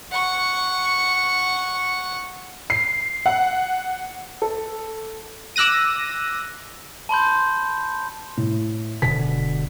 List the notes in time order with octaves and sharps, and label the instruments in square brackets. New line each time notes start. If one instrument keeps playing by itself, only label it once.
[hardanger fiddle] F#5 C#6
[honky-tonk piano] C7
F#5
A4
[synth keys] D6 E6 F#6 A#6 D#7
[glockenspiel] A5 B5 C6 G6
[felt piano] A2
[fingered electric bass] E1 B2 D3 [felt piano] B6